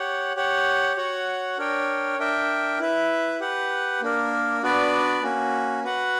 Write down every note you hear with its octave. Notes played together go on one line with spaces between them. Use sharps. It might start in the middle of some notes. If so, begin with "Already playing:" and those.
Already playing: G4 C#5 F#5
G4 C#5 F#5
F#4 C#5 F#5
D4 A#4 C#5 G5
D4 A#4 E5 G5
E4 B4 E5
G4 B4 F#5
A#3 D4 A#4
B3 D4 F#4 B4 D5
A#3 C#4 F#4
F#4 B4 F#5